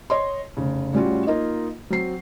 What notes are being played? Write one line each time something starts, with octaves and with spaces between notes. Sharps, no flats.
C#5 D#5 C6
F1 C#3
A2 G3 C#4 F4 F#4
A#3 D#4 F4 D#5
F#3 C4 C7